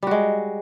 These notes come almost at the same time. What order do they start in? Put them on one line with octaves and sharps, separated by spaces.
G3 F#4 G#3